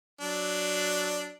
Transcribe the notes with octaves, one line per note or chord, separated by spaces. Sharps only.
F#3 D4